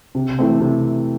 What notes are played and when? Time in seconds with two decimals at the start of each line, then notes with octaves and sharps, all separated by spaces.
0.15 C3
0.39 E3 A3 C4
0.60 C3